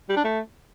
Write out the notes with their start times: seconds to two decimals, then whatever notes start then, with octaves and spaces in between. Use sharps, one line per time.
0.09 G3
0.17 D4
0.24 A3